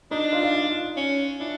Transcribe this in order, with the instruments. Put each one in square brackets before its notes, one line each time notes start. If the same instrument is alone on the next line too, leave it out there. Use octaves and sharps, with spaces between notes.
[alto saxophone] D4 [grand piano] D#4
[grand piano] F4
F4
F4
[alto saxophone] C#4
[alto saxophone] D4 [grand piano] E4